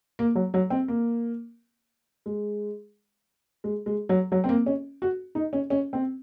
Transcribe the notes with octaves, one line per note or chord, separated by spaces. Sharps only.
A#3
F#3
F#3
C4
A#3
G#3
G#3
G#3
F#3
F#3
C4
A#3
C#4
F#4
D#4
C#4
C#4
C4